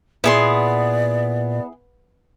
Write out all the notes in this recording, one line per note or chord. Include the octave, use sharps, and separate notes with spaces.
A#2 B3 E4 G#4 D5 C6